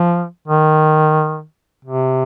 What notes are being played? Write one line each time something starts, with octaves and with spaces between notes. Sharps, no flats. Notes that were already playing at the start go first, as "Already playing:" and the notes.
Already playing: F3
D#3
C3